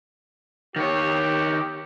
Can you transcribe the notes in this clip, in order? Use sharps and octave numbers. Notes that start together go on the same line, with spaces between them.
D#3 G4 C#5